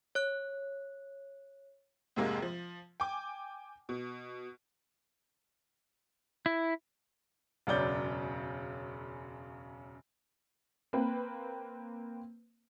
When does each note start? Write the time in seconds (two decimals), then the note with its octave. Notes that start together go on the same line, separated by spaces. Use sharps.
0.15 C#5 F#6
2.16 F2 G#2 C3 G#3 A#3
2.42 F3
3.00 G5 G#5 D6
3.89 B2
6.46 E4
7.67 E1 F#2 C#3 D5 G6 G7
10.93 A#3 C4 B4